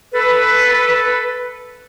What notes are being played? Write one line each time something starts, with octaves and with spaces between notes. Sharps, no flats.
A4 B4